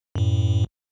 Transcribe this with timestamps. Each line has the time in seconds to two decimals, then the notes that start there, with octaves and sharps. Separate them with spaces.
0.16 F#2 A2